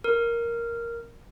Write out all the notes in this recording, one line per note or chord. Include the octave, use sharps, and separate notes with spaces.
A#4